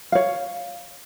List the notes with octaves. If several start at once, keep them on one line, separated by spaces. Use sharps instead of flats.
C#5 F5